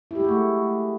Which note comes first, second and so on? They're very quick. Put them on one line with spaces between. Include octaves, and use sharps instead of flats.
E4 G4 G#3 F#4 A3